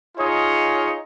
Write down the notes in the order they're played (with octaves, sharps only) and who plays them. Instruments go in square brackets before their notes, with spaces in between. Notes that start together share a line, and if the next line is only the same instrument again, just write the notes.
[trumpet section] D#4 F4 G#4 C#5 D#5